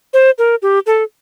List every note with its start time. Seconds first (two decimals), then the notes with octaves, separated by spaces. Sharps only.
0.14 C5
0.38 A#4
0.62 G4
0.86 A4